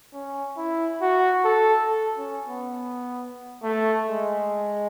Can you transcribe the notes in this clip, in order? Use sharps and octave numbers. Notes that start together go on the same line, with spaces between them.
C#4
E4
F#4
A4
A4
C#4
B3
A3
G#3